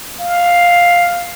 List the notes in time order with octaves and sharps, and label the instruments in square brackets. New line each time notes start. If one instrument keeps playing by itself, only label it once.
[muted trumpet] F5